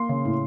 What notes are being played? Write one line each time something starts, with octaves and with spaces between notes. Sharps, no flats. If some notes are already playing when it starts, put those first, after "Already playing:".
Already playing: A#3 C6
C#3
A2